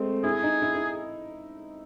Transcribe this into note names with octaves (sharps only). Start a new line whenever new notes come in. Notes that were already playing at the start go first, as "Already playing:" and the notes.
Already playing: G#3 A3 C4
E4 G#4
D#4
E4
E4